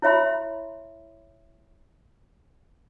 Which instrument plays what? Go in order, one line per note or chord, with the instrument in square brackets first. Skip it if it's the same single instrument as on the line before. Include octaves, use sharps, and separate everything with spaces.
[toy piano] E4 C#5 E5 B5 C6